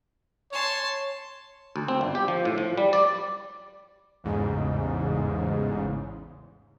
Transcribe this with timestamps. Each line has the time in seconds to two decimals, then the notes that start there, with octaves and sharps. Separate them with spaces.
0.52 C#5 A5 C6
1.76 D2
1.88 C4
2.01 G1
2.15 G4
2.28 F3
2.45 A2
2.58 F3
2.78 G3
2.93 D5
4.24 A1 E2 G#2 C#3